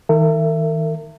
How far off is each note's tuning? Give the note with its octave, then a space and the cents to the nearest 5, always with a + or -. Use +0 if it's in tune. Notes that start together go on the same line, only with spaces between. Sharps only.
D#3 +40 A#4 -40 E5 +20